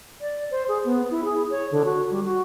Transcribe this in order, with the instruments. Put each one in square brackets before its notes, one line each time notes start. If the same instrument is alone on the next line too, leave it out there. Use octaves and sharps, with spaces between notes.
[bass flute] D5
C5
G#4
B3
E4
G#4
C#5
D3
F#4
G3
F#4